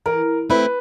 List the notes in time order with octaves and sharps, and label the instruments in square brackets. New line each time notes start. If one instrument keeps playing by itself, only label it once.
[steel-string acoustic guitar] E3 [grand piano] A#4
[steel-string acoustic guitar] A3 C4 E4 [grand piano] B4